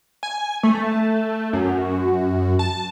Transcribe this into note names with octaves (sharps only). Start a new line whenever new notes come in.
G#5
A3
F#2
A5